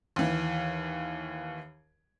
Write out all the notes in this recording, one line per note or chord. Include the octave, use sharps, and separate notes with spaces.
D#2 E3